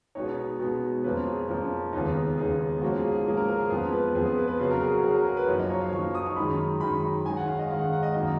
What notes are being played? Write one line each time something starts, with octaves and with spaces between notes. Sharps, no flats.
B2 G#3 B3 D#4 C#5
B2 G#3 B3 D#4
F2 F3 A#3 C#4 B4
G#4
F2 F3 A#3 C#4
D#2 C#3 G#3 B3 D#4
D#2 C#3 G#3 B3 D#4 G#4
G#2 F3 A#3 C#4 F#4
G#4
G#4
G#2 F3 A#3 C#4
A#4
A#4
G#4
F2 F3 B3 G#4
B4
F2 F3 B3 G#4
G#4
B4
B4
C#3 F#3 C#4 B4
A#4
G#4
F#4
C#3 F#3 C#4 G#4
A#4
G#4
B4
F#2 F3 A#3 D#4 C#5
D#5
C#5
F5
F#2 F3 A#3 D#4 C#6
D#6
C#6
F#2 D#3 G#3 D#4 B5
F#2 D#3 G#3 D#4 B5
G#2 D#3 G#3 C#4 G#5
F#5
F5
D#5
G#2 D#3 G#3 C#4 F5
F#5
F#5
D#5
F#2 D#3 A#3 D#5